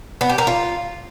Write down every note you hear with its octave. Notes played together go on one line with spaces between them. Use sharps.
B3
G4
A#4
F4